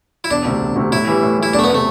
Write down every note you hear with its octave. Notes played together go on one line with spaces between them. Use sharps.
E4
E1 D4
D2 C3
E1
D2 C3
A2 E4
E3 G3
A2
E3 G3 E4
E1 D4
A3
B3
C3 A3